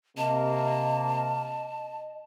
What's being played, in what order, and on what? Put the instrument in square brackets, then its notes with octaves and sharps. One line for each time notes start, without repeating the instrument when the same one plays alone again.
[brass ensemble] C3 A#3 [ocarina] D#5 [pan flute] A5